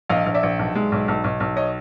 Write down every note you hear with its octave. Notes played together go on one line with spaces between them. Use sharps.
A#1 D#5 F5
A#1
D5 E5
A#1
B1
G#3
B1
B1
B1
B1
C#5 D#5